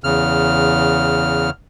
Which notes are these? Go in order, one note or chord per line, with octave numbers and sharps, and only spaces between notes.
E2 C#3 F6